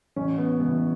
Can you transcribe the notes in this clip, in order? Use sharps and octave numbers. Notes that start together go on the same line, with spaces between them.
A1 C#4
B3
G2 E3 B3